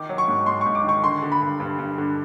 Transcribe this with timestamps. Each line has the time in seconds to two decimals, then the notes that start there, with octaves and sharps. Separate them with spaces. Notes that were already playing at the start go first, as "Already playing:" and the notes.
Already playing: D#3 D6
0.09 F#3
0.18 C#6
0.28 G#2
0.46 G#2 C6
0.61 G#2 C#6
0.75 D6
0.84 D#3 C#6
1.04 D3 C6
1.22 D3
1.32 B5
1.42 G2
1.60 G2
1.78 G2
1.98 D3